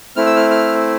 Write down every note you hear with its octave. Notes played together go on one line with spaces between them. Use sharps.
A3 C4 E4 F6
E6
F6
F6